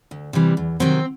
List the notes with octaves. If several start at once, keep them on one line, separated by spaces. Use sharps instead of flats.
D2
C3 E3 G3
E2
C3 D#3 F#3 C4